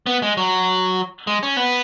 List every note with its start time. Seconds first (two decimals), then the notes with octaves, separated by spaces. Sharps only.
0.06 B3
0.22 G#3
0.37 F#3
1.27 G#3
1.43 C#4
1.57 B3